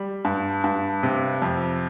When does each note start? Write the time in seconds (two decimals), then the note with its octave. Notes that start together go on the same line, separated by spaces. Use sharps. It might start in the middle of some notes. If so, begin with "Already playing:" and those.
Already playing: G3
0.25 G2
0.64 G2
1.03 C3
1.42 F2